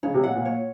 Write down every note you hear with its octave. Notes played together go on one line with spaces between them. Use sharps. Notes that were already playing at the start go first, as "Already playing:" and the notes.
C#3 C#5
C3
A#2 F#5
A#2
C#5